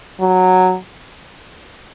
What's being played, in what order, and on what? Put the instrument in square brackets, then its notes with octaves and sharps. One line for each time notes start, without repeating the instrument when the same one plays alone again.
[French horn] F#3